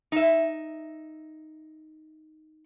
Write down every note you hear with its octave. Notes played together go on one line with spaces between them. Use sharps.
D#4 E5